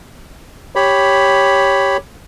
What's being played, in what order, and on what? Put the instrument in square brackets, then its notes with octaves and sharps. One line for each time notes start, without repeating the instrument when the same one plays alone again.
[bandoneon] G4 C#5 B5